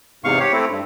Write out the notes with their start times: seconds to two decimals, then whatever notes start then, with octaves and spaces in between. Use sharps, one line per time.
0.24 E2 G#2 C3 F5 C#6
0.40 G4 C#5
0.53 A3 C4 E4
0.70 G2